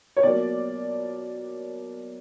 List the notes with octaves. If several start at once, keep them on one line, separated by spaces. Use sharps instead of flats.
C#5
B2 F#3 A#3 D5